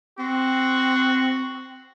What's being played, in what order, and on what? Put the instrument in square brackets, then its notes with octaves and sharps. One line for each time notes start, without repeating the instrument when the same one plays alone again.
[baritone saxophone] C4 [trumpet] F#4